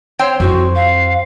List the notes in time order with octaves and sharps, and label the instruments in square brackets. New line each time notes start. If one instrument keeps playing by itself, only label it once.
[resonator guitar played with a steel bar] C4 C5 G5 [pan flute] C#5
[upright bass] F2 E4 [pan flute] F#4
[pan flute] F5